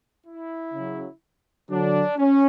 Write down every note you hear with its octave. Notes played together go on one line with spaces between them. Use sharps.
E4
C#3 F#3
D3 F#3 D4
C#4